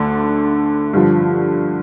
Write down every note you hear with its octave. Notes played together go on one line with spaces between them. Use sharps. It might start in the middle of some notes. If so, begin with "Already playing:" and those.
Already playing: D2 D3 A3 D4
G2 D3 F3